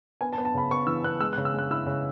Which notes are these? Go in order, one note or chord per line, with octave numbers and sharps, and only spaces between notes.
B3 G#5
A5
B3
A5
C#3 B5
B3 C#6
E3 E6
B3 F#6
G#3 E6
F#6
C#3
E6
G#3 F#6
E4 E6
C#3